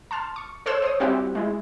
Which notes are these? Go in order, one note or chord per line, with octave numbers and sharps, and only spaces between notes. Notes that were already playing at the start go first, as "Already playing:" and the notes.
A5 C6 F6
C#6
A4 C5 C#5 E6 F#6
C5 C#5 D#6
G3 C4 E4 F#4 G4
G#3 E4